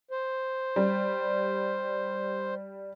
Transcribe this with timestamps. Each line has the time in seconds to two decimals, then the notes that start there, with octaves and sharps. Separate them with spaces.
0.11 C5
0.76 G3